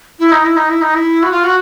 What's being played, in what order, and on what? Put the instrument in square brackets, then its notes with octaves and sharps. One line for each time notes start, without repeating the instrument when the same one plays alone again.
[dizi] E4
D#4
E4
D#4
E4
D#4
E4
F#4
F4
F#4